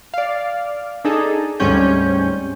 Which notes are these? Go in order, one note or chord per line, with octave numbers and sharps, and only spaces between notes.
D5 F5
D4 D#4 G#4 A4
D2 G#2 G3 C4 C#4 G6